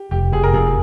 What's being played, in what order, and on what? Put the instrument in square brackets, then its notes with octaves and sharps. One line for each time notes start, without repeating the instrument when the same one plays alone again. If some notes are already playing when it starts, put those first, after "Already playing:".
Already playing: [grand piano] G4
[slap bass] F1 [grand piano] G4
[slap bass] F1 [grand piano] G#4
[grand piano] A#4
[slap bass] F2 [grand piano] G#4